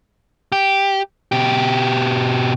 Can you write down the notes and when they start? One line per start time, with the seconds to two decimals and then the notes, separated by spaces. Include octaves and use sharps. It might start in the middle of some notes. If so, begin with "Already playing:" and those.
0.52 G4
1.32 B2 G4